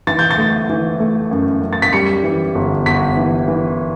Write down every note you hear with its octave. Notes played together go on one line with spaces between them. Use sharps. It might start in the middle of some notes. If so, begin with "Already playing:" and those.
E3 A6
G6
A6
A3
E3
A3
F#2
F#2
A6
B6
G3 C#7
E3
G1
G1 B6
E3
E3